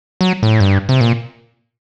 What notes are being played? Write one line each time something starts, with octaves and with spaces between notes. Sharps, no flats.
F#3
A2
G2
C3
A#2